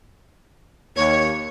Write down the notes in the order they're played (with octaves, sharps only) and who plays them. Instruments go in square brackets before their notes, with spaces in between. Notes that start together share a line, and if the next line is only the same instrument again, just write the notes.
[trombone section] D#2 [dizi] C#5